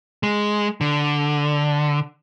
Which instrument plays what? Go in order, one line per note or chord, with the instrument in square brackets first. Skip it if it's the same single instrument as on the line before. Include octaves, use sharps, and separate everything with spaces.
[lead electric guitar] G#3
D3